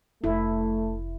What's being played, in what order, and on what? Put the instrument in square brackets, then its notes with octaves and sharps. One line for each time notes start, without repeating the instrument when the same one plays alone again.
[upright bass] F1 E3 [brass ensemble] A3 [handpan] E4